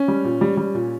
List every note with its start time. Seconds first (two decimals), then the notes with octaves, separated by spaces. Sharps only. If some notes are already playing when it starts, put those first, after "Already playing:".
Already playing: C#4
0.08 G3
0.24 A#2
0.41 G3
0.57 G3
0.75 A#2